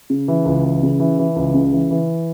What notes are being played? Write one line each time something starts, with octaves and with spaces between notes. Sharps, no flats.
C#3
E3
C#2
E3
C#3
E3
E3
C#2
C#3
E3
E3